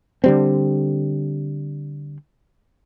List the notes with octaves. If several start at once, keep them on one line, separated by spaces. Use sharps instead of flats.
D3 G3 C4